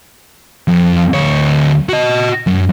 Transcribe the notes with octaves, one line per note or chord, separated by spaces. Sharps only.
F2
D2 C#5
F#4 D#5
F#2